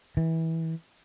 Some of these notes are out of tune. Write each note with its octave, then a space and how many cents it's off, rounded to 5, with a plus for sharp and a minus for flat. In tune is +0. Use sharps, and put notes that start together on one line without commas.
E3 -20